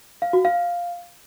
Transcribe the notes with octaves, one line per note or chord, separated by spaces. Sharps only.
F5
F#4
F5